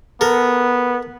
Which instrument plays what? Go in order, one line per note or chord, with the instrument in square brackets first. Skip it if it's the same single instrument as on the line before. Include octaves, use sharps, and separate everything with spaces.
[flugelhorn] B3 [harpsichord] A4 A#4